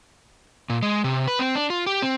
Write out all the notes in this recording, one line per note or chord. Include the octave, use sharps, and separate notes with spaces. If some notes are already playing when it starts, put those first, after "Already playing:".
A#2
G#3
C3
B4
C4
D4
F4
G4
C4